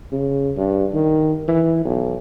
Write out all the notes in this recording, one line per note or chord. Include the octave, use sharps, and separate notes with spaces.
C#3
G2
D#3
E3
B1